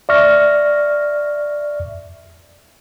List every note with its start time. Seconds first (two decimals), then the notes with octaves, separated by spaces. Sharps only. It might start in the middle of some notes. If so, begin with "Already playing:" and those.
0.09 D5 E5 C#6 F6 A#6